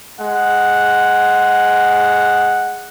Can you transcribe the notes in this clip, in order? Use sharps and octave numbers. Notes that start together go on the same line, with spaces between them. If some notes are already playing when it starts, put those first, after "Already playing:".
G#3 F#5